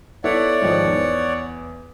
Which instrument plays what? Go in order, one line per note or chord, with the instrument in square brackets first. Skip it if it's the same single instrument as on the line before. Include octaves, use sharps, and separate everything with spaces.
[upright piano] B3 E4 A4 [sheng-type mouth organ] C#5 D5 F#5
[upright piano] G#2 D#3 F3
E2